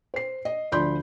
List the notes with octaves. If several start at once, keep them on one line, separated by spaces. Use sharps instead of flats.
C5 C7
D#5
D2 F3 D5 B5 C6 G6